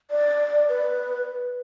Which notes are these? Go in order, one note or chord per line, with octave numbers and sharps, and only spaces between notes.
D5
B4